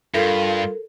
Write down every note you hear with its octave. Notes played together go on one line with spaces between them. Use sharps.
G2 F4 A4 A#4